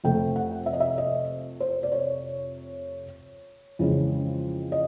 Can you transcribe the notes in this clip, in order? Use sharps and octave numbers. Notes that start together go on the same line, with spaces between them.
F2 C3 F3 A3 G5
F#5
E5
D#5
E5
D#5
C5
D5
C#5
F2 C#3 E3 G#3 C#4
D#5